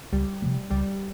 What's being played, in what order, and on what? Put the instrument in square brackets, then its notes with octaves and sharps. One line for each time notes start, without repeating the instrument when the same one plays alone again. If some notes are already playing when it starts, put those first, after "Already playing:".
[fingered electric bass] C#2 [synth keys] G3
[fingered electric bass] C3 F3 A3
[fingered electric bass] C#2 [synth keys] G3